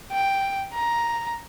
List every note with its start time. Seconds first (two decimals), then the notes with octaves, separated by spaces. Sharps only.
0.12 G5
0.74 A#5